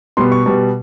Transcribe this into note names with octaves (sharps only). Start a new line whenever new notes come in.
B2 G3 B3 C6
C#6
B2 G3 B3